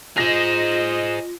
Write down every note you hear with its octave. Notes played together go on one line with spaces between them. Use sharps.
F4 G#4 C5 D#5 A#6 F7